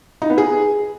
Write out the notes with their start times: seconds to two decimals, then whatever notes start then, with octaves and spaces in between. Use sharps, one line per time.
0.22 D#4
0.30 B3
0.38 G#4